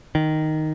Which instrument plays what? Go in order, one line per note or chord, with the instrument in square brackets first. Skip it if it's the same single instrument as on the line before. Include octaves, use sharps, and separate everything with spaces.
[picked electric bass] D#3